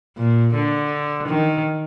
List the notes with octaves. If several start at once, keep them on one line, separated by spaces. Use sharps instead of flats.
A#2
D3
D#3